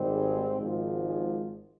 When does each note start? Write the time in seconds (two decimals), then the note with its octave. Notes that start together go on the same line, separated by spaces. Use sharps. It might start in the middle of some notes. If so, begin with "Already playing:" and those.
Already playing: G#1 G#2 G3 C4
0.11 G#4
0.59 G#1 G#2 F3
1.06 G#4